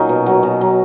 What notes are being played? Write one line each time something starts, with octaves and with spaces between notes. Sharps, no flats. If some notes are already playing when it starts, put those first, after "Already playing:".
Already playing: A#2 F#3 C#4 D#4
B2
F#3
B2
F#3